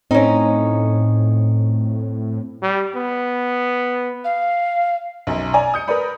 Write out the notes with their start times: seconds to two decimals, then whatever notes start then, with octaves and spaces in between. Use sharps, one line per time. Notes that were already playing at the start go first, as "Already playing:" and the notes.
0.11 A2 C4 C#4 D#4
2.62 G3
2.95 B3
4.24 F5
5.27 B1 F#2
5.54 D5 G#5 A#5
5.74 D#6 G6 C#7
5.88 A#4 B4 D5 B5